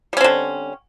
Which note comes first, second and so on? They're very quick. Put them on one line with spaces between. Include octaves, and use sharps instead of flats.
G3 C#4 C4 D3